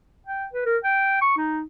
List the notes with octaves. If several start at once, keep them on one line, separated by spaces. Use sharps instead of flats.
G5
B4
A#4
G5
C#6
D#4